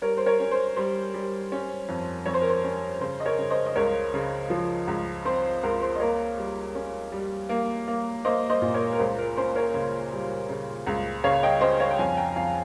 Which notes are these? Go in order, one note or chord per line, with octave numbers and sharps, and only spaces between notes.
G3 A#4 C#5
C5
A#4 C#5
C#4
C5
G3 C5
G3
C#4
F2
F2 C#5
C5
A#4
C5
C#4
C#3 C5
D#5
A#4 C#5
C#3
C5 D#5
D#5
C#2 A#4 C#5
C#3
F3
C#2
C4 C5
C#2 A#4
C5
D#5
A#3 A#4 C#5
G3
C#4
G3
A#3
A#3
A#3 C5 D#5
C5 D#5
A#2
A#4 C#5
A#4
C#2 C5
A#4
C#4 C5
A#4 C#5
C#3
G3
C#3
C#2
C#3 C#5 F5
D#5 G5
C#4 C5 D#5
C#5 F5
G5
F2 F5 G#5
G5 A#5
F2 F5 G#5